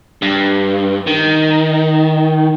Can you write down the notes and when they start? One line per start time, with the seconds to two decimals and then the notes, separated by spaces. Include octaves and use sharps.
0.22 G2
1.07 D#3